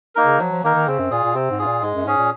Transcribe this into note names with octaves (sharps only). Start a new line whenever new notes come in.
A#3 D#4 A#4
C#3
F3 F#3
F3
D#3 A#3 D#4 A#4
D#3
C#3 C4
F#2
A#2 F4 G#4
A#2
C3 C4
G#2
F4 G#4
A#2
G#2 G#3
F#2
G#2 C#4 G#4
A#2